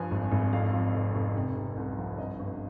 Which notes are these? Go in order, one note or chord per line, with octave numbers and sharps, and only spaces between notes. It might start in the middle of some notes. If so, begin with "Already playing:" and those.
Already playing: G2 F3 G#5
G#1
G#1
F2 F5
F3
F1
F1
C3
C3
C2
F3
G2 D#5
G1